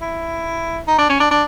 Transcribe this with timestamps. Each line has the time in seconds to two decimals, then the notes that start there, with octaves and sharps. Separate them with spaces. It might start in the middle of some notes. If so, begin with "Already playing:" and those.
0.01 E4
0.87 D#4
0.98 D4
1.09 C#4
1.20 D4
1.31 D4